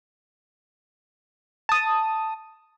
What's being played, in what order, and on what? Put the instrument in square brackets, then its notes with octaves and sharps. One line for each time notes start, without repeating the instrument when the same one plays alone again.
[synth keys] A5 D#6